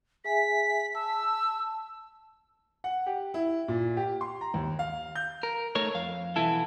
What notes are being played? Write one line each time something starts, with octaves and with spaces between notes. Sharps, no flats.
G#4 E5 G#5 B6
A5 E6
F#5
G4
E4
A#2
G4
C6
A#5
D#2
F5
G6
A#4
A3 D#4 A#4 C#5
F2 F5
B1 E3 B3 E4 A4